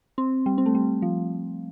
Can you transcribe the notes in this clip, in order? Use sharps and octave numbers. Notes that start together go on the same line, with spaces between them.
C4
G3
C4
A3
G3
F3